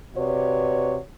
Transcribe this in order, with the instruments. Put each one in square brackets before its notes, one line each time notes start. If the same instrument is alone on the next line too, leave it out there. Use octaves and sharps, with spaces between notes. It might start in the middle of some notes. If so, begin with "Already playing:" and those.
[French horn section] C3 F#4 B4 C#5 D5